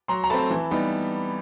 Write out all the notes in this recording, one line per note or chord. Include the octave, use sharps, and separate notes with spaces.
F#3 A#5 C6
A#5
A3 C4 A5 B5
E3
G3 B3 D#4